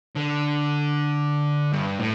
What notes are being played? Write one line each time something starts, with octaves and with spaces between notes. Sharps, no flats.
D3
G2
A2